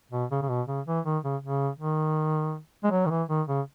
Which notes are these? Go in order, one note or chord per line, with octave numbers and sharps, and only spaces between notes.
B2
C#3
C#3
B2
C#3
E3
D#3
C#3
C#3
D#3
G#3
F#3
D#3
E3
D#3
C#3